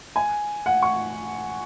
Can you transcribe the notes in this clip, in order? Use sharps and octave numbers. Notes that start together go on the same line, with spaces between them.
G#5
F#5
C#6